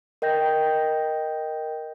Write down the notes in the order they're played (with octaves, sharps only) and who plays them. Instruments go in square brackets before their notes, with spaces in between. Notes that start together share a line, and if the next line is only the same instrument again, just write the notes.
[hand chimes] A#4 D#5 G5 G6 A#6